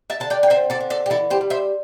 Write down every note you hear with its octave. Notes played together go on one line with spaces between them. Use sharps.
E5 A5
D3 A5
D5 G5
G5
C4 C5 E5
A4 D5
D3
A4 D5
G4
E3 E4 A4
G4 C5
G3
C5 E5